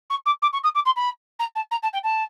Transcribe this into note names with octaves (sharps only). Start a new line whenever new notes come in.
C#6
D6
D6
C#6
D#6
D6
C6
B5
A#5
A5
A#5
A5
G5
A5